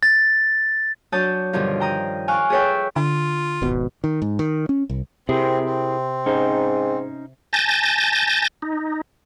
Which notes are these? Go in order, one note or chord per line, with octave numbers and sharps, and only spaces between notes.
A6
F#3 D4 C#5 A5 D#6 G6
G2 B2 D3 D#3 F3
G5 A#5 D#6
F5 G#5 C#6 D6 F6 F#6
G#4 A4 B4 C#5 E5 G5
D3 F4
D1 G#1 B2
D#3
G#2
D#3
C#4
C2
C3 C4 E4 G#4 A#4
C4
G#2 C#4 D#4 C5
G#5 A5 G6 A6 A#6
D#4